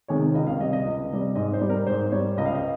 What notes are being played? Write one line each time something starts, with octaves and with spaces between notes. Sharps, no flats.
C3 D#3 G#3 C#5
C#2 D#5
F5
C3 G3 D#5
D#5
C#2
C3 G3
G#2 D#5
C5
G3
A#4
G#2 C5
G3 C#5
C#2 D#5
F5
D#5